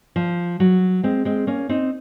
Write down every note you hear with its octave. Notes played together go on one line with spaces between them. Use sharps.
F3
F#3
G#3 C4
G#3 C4
A#3 C#4
C4 D#4